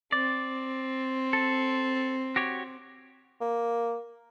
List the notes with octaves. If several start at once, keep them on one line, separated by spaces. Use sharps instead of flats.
C4 D5
A4
F#4 G4 C#5
A#3